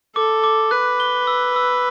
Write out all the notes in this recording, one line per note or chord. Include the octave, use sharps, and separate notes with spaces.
A4 D6
D6
B4 F#6
G7
E6
E6